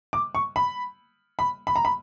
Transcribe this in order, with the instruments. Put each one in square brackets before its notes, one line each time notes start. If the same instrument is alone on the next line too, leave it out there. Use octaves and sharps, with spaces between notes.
[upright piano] D6
C#6
B5
B5
B5
A#5
B5